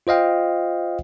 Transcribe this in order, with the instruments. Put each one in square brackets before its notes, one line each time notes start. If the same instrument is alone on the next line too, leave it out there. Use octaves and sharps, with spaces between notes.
[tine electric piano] F4 C5 D#5 F5 G5